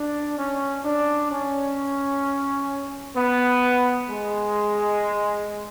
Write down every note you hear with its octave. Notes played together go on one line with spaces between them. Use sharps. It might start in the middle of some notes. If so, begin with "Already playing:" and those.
Already playing: D4
C#4
D4
C#4
B3
G#3